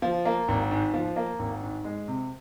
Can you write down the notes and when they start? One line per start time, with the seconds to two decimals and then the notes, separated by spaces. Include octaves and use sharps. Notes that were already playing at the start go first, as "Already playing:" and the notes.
0.02 F3
0.25 A#3
0.48 G#1
0.71 G#2
0.94 F3
1.16 A#3
1.39 G#1
1.62 G#2
1.84 G#3
2.08 C3